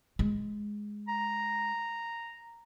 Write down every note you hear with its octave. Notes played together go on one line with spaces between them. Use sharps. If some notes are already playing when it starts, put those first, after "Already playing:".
G#3
A#5